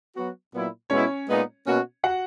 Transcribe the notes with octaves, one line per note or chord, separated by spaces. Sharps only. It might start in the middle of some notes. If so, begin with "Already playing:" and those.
F#3 B3 F#4
A#2 F#3 B3 E4
B2 G#3 B3 C#4 E4 C#5
A#2 G#3 B3 D#4
B2 A#3 C#4 F#4
F#4 F#5